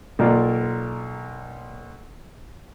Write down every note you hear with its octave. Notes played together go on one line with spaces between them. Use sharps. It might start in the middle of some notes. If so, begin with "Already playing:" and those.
B1 A#3 F4 D5